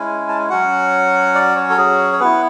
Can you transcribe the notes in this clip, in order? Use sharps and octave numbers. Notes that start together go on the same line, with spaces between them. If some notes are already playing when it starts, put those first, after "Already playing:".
Already playing: G#3 C#4 E4 G#5
A5
G#5
F#3 C#4 F#4 F#5
D5
C#5
A4
G#4
C#5
B3 E4 B4